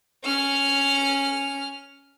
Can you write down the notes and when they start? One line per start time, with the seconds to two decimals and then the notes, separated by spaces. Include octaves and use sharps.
0.24 C#4 F6